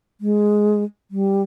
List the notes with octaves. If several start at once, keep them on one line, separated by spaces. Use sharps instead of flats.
G#3
G3